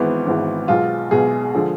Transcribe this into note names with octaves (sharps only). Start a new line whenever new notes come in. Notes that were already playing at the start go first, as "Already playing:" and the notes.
Already playing: G#1 G#2 E3 B3
G#1 G#2 E3
B1 B2 G#3 F4
B1 B2 G#3 G#4
D3 F3 G#3